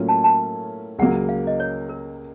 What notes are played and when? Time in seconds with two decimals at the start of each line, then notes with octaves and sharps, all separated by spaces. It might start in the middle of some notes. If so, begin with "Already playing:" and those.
Already playing: A2 F#3 A#3 C#4 F4
0.09 A5
0.24 A5
0.99 C#2 C#3 F#3 A#3 F#5
1.29 F5
1.47 D#5
1.60 C#5
1.89 A#4